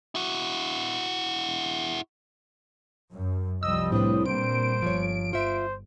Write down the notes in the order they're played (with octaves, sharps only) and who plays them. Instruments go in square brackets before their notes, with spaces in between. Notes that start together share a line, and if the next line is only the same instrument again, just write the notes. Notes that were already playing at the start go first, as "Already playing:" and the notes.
[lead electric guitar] E4 F#4
[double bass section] F#2
[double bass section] C2 F3 G3 [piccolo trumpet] D#5 [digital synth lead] E6
[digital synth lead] A2 [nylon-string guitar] C4 D4 B4 [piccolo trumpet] D#6
[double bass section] A#2 G3 A#3 [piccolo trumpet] C5 [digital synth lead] D7
[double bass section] G1 [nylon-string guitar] F3 C#5
[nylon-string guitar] F4 E5 [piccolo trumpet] C5